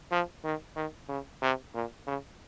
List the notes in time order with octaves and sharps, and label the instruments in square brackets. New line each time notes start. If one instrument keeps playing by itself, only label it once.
[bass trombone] F3
D#3
D#3
C#3
C3
A#2
C#3